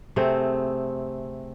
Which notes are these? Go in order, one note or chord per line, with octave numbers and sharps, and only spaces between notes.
C3 A3 C4 G#4